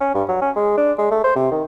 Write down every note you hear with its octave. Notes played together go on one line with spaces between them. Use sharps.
C#4
G2
F#3
C#4
G#3
D4
G#3
A3
C5
C3
D#3